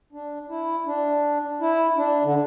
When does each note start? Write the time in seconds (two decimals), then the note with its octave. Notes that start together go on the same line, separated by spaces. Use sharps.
0.13 D4
0.50 E4
0.86 D4
1.61 E4
1.97 D4
2.24 D3